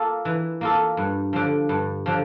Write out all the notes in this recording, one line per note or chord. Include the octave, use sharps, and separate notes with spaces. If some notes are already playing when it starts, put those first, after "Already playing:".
Already playing: A#3 F4 A4
E3
A#3 F4 A4
G2
D3 F3
G2
D3 F3